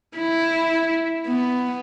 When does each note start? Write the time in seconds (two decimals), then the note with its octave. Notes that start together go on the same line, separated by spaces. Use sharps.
0.18 E4
1.26 B3